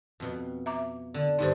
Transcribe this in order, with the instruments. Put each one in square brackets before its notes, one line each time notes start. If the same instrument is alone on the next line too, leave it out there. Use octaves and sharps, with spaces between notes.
[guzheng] F2 B2
[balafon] E5 A#5 D6
[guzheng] D3
[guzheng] G2 D3 G3 [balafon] D#4 C5